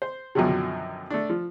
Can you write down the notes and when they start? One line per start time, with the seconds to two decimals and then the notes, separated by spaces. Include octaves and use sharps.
0.02 C5
0.35 F#2 B2 D3 D#3 F3 F#3
1.10 A3 D4
1.29 F3